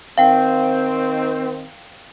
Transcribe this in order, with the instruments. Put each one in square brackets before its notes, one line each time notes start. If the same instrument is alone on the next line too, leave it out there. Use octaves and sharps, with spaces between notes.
[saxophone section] D#3 C4 [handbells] F5 G5